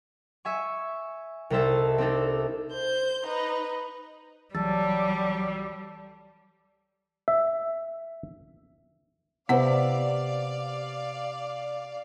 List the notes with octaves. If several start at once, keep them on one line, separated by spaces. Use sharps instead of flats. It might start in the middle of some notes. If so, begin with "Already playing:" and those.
E5 G#5 C#6
C2 D#4 A4 C5 E5 A5
C4 D4 D#4 A4
C5 G6
D#4 B4
C2 E3 F#3 G3 A4 A6
E5
C3 B3 E4 B4 C5 D5 F5 F#5